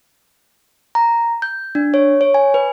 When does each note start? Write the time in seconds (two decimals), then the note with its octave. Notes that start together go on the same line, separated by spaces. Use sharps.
0.95 A#5
1.42 G6
1.75 D4
1.94 C#5
2.21 C#5
2.34 G#5
2.54 B4